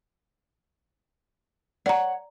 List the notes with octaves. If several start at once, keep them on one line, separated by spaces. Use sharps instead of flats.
C#5 D5 F#5 A#5